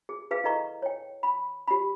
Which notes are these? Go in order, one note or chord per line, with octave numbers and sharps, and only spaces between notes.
G#4
G#4 B4 F5
E4 A4 D#5 A#5 C#6
C#5 G5
B5
G4 B5